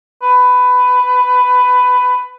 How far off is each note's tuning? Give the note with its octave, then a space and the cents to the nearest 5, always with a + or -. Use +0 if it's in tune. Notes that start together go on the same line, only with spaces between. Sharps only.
B4 +15